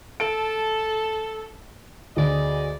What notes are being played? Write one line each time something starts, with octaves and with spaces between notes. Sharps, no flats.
A4 A5 D7
D2 G#4 D5 D#5